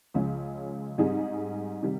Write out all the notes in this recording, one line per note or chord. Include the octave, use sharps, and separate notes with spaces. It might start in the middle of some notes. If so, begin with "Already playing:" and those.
C#2 C#3 F3 G#3 C#4
G#2 G3 C4 D#4 G#4
C3 D#3 G3